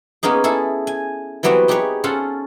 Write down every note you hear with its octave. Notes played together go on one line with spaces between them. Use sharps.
A#3 B3 C#4 D#4 G#4
E4 G#4 A4
G#5
E3 F#3 G3 B3 C4 F#4
D#4 G4 G#4 B4 C#5
C#4 F4 A4 C5 F#5